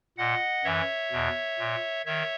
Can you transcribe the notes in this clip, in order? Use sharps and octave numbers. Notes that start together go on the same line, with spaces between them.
A#2 D#5 F#5
F#2 E3 C#5 E5
E2 B2
A#2
D#3 C#5 E5